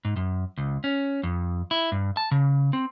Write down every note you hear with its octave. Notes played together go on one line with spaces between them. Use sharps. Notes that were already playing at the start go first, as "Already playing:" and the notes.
G#2
F#2
C#2
C#4
F2
E4
G2
A5
C#3
C4